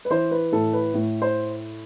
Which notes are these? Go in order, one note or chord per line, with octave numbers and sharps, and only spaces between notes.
B4
E3 C5
B4
A2 A4
B4
A2
C5